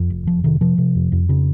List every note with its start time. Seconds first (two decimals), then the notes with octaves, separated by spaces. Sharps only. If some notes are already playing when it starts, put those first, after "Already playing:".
Already playing: F2
0.10 F1
0.27 F1 F3
0.44 C3 D#3
0.61 C3 F3
0.78 C3
0.95 F2
1.12 F2
1.29 C#3